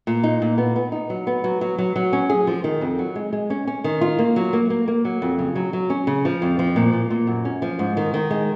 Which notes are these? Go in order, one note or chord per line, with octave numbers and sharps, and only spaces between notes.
A#2
D#4
A#2
B3
B3
D#4
F#3
B3
F#3
F#3
F#3
F#3
C#4
G#4
F3
D#3
F2
F#3
G#3
G#3
C#4
C#4
D#3
F4
A#3
F#3
A#3
A#3
A#3
F#3
F2
C#3
F#3
F#3
C#4
C#3
F3
F2
F3
A#2
A#2
A#2
F#2
C#4
F3
G#2
D#3
D#3
G#3